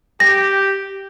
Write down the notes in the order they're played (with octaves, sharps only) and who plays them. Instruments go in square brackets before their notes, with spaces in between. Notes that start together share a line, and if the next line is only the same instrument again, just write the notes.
[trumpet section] G4 [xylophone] A#6